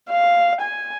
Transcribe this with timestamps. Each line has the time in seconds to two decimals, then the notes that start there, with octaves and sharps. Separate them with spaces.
0.10 F5
0.61 G#5